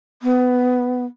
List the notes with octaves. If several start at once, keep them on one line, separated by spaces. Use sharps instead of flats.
B3